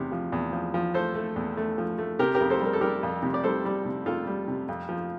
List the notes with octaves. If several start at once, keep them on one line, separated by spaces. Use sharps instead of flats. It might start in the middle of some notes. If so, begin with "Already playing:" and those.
Already playing: E2 C3
F3
E2
F3
F3
A3 A4 C5
A3
E2
A3
F3
A3
C3 G4 A#4
G4 A#4
F2
A4 C5
G3
A#4
A4
G3 G4 A#4
F2
C3
D5
G3 A4 C5
G3
C3
F2 F4 A4
G3
C3
F2
F3